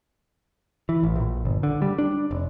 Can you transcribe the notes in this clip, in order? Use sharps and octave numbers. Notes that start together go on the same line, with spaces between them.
E3
A1
A#1
G1
D3
G3
D4
F1